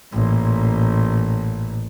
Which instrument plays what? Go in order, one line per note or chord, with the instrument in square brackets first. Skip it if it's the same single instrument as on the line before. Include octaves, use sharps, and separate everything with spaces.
[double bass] A1 A#2